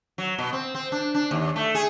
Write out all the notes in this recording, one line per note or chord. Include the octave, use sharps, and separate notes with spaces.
F#3
B2
C4
C4
D4
D4
D#2
A3
G#4